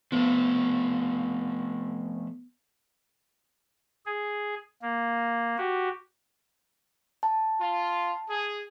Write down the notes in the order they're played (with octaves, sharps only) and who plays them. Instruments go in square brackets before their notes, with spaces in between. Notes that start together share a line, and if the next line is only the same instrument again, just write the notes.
[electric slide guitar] F3 A3 [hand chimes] B3
[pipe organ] G#4
A#3
F#4 G4
[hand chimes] A5
[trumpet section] F4
G#4